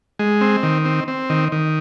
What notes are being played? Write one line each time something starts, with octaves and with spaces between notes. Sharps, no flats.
G#3
C4
D#3
C4
C4
D#3
D#3